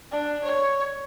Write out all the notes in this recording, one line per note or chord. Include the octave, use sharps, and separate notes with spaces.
D4
C#5